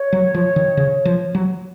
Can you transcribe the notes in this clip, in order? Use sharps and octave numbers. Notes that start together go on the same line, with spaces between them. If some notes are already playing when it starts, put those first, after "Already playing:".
Already playing: C#5
F#3
F3
D#3
C#3
F3
F#3